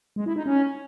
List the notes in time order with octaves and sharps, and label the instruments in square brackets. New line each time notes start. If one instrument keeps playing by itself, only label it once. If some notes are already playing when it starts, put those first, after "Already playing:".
[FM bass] G#3
E4
D#4
C#4